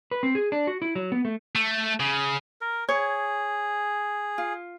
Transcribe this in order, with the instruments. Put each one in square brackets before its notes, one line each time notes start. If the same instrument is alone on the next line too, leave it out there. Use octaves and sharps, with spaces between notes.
[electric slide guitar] B4
C4
G#4
D4
F#4
E4
F#3
B3
A3
[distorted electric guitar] A3
C#3
[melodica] A#4
[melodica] G#4 [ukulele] C#5
[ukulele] F4